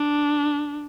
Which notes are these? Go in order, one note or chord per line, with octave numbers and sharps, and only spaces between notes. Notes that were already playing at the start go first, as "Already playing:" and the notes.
Already playing: D4